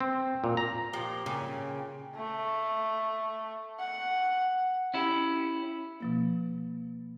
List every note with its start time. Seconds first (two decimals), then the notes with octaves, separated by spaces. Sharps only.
0.01 C4
0.44 A#2
0.57 A#5
0.93 A#2 F3 G4
1.26 A#2 C#3 G5
2.16 A3
3.80 F#5
4.94 C#4 E4 G4
6.00 B2 F3 A#3